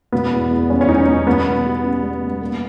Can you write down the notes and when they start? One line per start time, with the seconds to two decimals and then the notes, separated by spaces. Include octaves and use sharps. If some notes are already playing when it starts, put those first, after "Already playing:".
0.12 B2 B3
0.31 E2
0.51 E2
0.70 G3 C#4
0.81 C#4
0.89 B2 D#4
1.08 E2
1.27 G3 B3
1.46 B2
1.65 G4
1.84 C#4
2.03 G3
2.22 B2
2.41 A#3